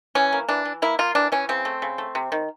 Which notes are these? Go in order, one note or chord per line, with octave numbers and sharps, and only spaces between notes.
E3 C#4
A#3
E3 D4
E3
A#3 E4
A#3 F4
E3 D4
E3 C#4
C#3 C4
A3
C#3
A3
C3
D#3